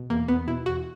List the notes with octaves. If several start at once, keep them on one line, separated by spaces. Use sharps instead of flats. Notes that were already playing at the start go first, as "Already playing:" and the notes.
Already playing: B2
E2 A#3
E2 B3
B2 E4
E2 F#4